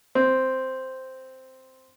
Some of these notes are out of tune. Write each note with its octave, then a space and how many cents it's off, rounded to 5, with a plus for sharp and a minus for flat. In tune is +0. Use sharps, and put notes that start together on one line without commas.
C4 -5